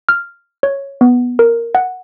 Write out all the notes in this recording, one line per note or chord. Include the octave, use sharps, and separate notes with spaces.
F6
C#5
B3
A#4
F#5